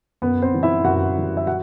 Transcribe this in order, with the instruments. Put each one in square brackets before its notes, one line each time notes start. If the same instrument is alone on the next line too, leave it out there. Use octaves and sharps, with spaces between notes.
[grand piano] F#2 B3 B4
C4 C5
E3 G3
E4 E5
F#2 F#4 F#5
E3 G3
E5
F#4 F#5